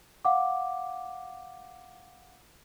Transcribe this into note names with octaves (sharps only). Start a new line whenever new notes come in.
F5 F#5 D6